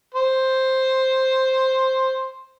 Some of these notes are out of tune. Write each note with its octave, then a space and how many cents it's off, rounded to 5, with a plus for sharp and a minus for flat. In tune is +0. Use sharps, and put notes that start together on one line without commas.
C5 +5